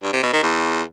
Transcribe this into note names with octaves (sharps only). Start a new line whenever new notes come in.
G2
C3
B2
D#3
E2